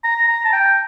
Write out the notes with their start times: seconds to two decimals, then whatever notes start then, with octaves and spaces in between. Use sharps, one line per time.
0.04 A#5
0.28 A#5
0.45 A5
0.53 G5